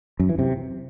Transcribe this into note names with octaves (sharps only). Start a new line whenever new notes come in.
F#2
E3
C3